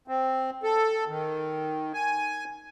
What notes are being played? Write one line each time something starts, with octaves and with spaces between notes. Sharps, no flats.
C4
A4
D#3
G#5